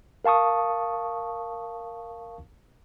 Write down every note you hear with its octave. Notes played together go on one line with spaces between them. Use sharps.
A#4 F5 A5 C#6 D#6